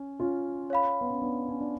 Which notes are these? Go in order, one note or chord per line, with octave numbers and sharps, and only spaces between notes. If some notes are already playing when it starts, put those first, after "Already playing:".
Already playing: C#4
C#4 F4
C#5 F5 B5
B3
C#4
B3 D4
C#4
D4